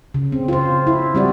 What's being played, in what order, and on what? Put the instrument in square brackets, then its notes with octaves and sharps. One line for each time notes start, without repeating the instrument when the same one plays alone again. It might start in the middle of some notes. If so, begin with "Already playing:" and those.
[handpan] C#3
C4
F4 C5
E4
G3 C4 F#4 D5